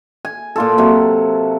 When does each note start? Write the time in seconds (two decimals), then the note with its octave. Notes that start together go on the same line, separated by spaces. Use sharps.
0.25 G#5
0.56 A#2 F4 A4
0.78 C3 F#3